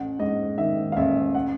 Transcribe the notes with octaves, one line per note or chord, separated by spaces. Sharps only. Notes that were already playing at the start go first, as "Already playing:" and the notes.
Already playing: A1 F#5
G#2 D#5
D#3 E5
F5
A1 E5
F#5